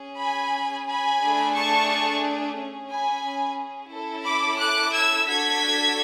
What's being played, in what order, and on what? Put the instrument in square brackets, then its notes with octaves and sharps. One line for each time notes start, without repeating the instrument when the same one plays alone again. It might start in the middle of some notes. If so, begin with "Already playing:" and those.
Already playing: [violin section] C#4 G#4
G#5 B5
G#5 B5
A3 D4 G#4
A5 C#6
C#4 G#4
G#5 B5
C#4 E4 A4
B5 D6
D6 F#6
E6 G#6
D4 F#4 A4 G#6 B6